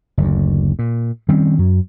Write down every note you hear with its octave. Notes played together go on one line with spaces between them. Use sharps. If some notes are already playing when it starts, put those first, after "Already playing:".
F#1 D2
A#2
D#3 G3 C4 C#4
F#2 F#3